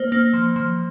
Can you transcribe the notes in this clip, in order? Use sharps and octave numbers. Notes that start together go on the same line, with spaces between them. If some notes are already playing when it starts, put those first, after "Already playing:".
Already playing: A#3 C5
A#3
F3
F3